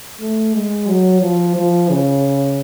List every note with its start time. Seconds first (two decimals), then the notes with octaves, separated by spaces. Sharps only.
0.21 A3
0.54 G#3
0.87 F#3
1.21 F3
1.56 F3
1.90 C#3